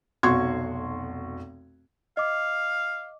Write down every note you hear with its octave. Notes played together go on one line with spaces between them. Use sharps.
F1 B1 F#4 C6 C#6 G#6
D#5 F5 D6